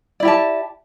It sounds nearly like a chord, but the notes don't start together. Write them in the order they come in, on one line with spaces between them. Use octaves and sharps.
D5 E4 G4 A5